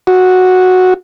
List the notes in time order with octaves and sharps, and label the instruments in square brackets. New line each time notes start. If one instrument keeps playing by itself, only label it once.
[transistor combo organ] F#4